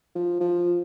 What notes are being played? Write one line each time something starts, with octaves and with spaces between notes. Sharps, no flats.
F3
F3